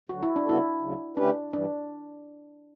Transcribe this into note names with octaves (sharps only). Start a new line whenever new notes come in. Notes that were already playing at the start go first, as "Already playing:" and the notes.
D2 D3 F#3 F#4
E4
D4
C#3 G3 B3 E4 F#4 A4
D2 C#3 F#3
D3 A3 C#4 D4 G4 B4
G2 E3 G3 D4